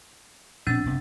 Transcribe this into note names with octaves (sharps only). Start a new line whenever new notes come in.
A#1 B2 C4 D4 A6
F#1 C3 B3